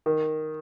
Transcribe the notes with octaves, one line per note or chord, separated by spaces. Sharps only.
D#3